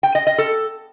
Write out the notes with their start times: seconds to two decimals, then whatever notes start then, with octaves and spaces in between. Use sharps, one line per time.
0.03 G5
0.15 D#5
0.27 D#5
0.38 A4